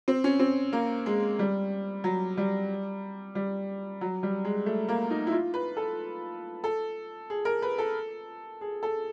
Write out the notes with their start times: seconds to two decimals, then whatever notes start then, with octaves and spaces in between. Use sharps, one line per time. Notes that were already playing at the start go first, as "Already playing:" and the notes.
0.08 C4
0.24 C#4
0.39 C4
0.73 A#3
1.06 G#3
1.39 G3
2.04 F#3
2.37 G3
3.35 G3
4.01 F#3
4.23 G3
4.45 G#3
4.66 A3
4.89 A#3
5.10 D#4
5.27 E4
5.32 F4
5.54 B4
5.77 A4
6.64 A4
7.30 G#4
7.45 A#4
7.62 B4
7.78 A4
8.61 G#4
8.83 A4